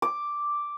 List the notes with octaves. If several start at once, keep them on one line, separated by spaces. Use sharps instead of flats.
D6